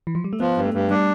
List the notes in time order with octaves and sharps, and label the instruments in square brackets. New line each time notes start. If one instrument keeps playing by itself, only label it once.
[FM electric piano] E3
F3
G3
A3
[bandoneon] F3 [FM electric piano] B3
[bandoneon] G2
[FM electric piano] A3
[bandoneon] G2
[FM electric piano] G3 [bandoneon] D4